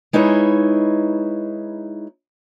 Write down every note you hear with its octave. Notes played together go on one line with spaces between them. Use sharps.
G#3 D#4 E4 B4 C#5